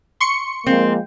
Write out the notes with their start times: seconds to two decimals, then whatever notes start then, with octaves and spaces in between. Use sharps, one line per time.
0.20 C6 C#6 C#7
0.66 F3 G#3 A#3 C4